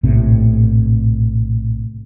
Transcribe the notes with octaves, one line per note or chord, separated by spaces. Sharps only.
A#1 A2 C3